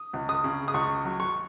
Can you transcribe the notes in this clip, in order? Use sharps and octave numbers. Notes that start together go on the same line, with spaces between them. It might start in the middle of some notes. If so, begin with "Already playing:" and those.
Already playing: D#6
C#2
D#6
C#3
D#6
C#2 C#6
F#3
C#6